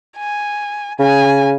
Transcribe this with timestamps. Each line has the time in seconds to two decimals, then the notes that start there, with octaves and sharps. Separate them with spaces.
0.17 G#5
0.99 C#3 G#5